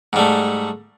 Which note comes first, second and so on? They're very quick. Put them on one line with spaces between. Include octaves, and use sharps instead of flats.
G#2 G3 A3